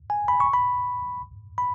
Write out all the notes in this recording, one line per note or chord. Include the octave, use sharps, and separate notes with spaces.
G#5
B5
C#6
B5
B5